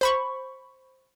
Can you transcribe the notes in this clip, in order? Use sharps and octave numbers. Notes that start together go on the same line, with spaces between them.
C5 B5 C#6